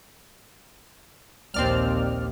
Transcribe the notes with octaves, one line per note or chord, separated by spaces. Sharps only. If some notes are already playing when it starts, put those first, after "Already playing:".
A#1 D#2 C4 D5 F6